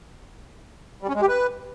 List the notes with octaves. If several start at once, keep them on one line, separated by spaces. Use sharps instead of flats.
G3
C#4
G#3
G4
B4